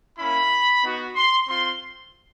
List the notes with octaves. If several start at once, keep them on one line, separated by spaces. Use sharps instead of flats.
A#3 C#4 E4 B5
B3 D#4 F#4
C6
C4 F4 C6